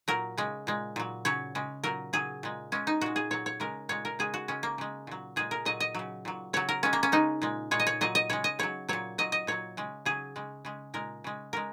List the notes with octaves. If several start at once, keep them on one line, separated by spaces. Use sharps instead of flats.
A#2 F#3 A#4
C#3 G#3
A#2 G#3
A#2 F#3
C#3 F#3 C#5
C#3 G#3
A#2 F#3 A#4
C#3 F#3 G#4
A#2 G#3
C#3 G#3 C#4
D#4
A#2 G#3 F#4
G#4
A#2 F#3 C#5
C#5
C#3 G#3 A#4
A#2 G#3 C#5
A#4
C#3 G#3 G#4
F#4
C#3 G#3 C#4
A#3
C#3 G#3
A#2 F#3
A#2 G#3 G#4
A#4
A#2 F#3 D#5
D#5
C#3 F#3
A#2 F#3
C#3 F#3 C#5
A#4
C#3 G#3 C#4
A#3
C#4
C#3 G#3 D#4
A#2 G#3
A#2 G#3 C#5
D#5
C#5
A#2 F#3 D#5
D#5
C#3 G#3 C#5
D#5
C#3 F#3 C#5
A#2 F#3 C#5
A#2 F#3 D#5
D#5
A#2 F#3 C#5
C#3 G#3
C#3 F#3 G#4
C#3 G#3
C#3 G#3
A#2 G#3 A#4
C#3 G#3
C#3 G#3 A#4